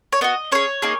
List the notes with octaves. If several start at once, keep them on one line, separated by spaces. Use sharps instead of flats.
C#5
B3 F#4 D#5
C#4 G#4 C#5
A#3 D#4 G#4